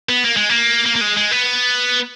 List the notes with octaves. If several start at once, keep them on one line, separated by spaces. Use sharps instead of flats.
B3
A#3
G#3
A#3
A#3
A#3
G#3
G#3
B3